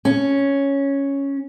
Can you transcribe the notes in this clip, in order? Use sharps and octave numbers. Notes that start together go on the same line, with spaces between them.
C#4